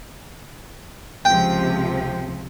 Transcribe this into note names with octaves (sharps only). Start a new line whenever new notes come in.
C#2 C3 F3 G5